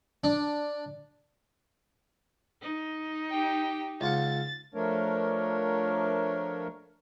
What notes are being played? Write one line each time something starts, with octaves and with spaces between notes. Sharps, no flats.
D4
D#4
G4 G5
C#2 F4 F#5 A6
F3 A3 D4 A#4 C#5